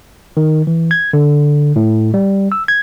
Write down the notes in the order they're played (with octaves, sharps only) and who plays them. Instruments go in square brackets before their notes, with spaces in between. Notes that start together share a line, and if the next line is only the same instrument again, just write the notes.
[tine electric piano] D#3
E3
G#6
D3
A2
G3
E6
G#6